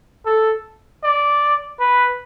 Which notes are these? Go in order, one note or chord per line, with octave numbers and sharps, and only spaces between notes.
A4
D5
B4